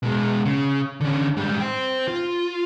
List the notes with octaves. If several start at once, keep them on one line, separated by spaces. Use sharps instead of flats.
B2 G#3
C#3
D3 C#4
G#2 G3
C5 G5
F4